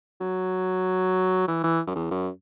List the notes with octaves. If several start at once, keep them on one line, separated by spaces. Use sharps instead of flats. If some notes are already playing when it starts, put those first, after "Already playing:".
F#3
E3
E3
F#2
E2
F#2